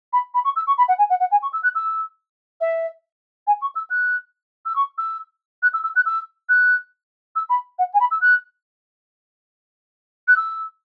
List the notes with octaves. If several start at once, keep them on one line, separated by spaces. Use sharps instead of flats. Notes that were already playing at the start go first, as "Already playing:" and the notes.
B5
B5
C#6
E6
C#6
B5
F#5
G#5
F#5
F#5
G#5
C#6
E6
F#6
E6
E5
G#5
C#6
E6
F#6
E6
C#6
E6
F#6
E6
E6
F#6
E6
F#6
E6
B5
F#5
G#5
B5
E6
F#6
F#6
E6